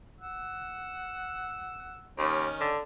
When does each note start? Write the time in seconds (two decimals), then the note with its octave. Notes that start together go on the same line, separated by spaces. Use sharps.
0.21 F#5 E6
2.18 D#2 D#3 C#4 D#4
2.60 D3